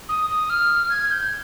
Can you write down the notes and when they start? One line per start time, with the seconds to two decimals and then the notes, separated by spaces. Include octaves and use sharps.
0.09 D#6
0.30 D#6
0.50 F6
0.90 G#6
1.11 G6